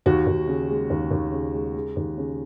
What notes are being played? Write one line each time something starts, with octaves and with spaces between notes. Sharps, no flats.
D#2 F#4
D#2
C#3
G#3
D#2
D#2
C#3
G#3
G#3
D#2
C#3